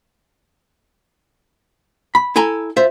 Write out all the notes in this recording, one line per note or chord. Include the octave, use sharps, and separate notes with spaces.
B5
E4 A4 G#5 A#5
F4 C5 E5